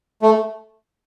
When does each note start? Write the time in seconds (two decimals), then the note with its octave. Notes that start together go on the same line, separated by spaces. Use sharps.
0.22 A3